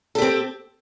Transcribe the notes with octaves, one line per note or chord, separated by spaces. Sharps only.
C4 G4 A4